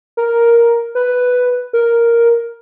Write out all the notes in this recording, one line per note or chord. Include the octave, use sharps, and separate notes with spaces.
A#4
B4
A#4